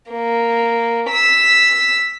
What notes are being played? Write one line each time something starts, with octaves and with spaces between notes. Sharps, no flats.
A#3
E6 B6